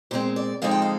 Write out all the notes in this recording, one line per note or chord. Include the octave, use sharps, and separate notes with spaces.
A#2 G#3 C4 C5
D5
D3 F3 G#3 C4 D#4 F5
G5
F5